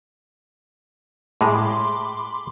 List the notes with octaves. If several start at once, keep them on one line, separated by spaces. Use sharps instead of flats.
A2 G#3 G#4 B5 C6 D6